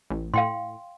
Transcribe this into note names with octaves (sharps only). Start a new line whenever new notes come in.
A1
A2 F5 G5 C6